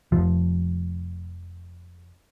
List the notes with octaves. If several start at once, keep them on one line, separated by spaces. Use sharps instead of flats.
F1 F3